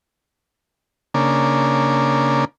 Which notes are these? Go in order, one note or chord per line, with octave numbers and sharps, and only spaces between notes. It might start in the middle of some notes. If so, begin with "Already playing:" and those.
C#3 A#3 D4